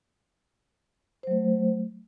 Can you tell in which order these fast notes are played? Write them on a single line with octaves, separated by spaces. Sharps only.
C5 F#3 A3